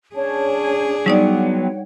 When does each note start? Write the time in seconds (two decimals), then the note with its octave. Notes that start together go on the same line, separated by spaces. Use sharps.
0.15 C#4 D4 G#4 C#5 A5
1.06 F#3 G3 B3 D#4 C#5 D5 F#5 G5